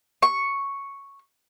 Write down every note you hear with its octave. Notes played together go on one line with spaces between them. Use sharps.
C#6